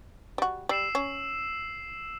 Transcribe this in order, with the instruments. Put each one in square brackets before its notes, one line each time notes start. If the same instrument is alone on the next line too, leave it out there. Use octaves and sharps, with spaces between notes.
[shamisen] G3 F#4
[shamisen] G3 [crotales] E6 C7 E7
[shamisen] C#4